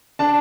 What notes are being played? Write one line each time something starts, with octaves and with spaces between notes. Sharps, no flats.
D4 A5